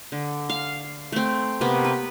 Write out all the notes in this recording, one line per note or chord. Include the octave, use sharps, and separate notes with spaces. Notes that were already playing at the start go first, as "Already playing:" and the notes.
D3
F5
A3 C4
C3 A#3 B3
B4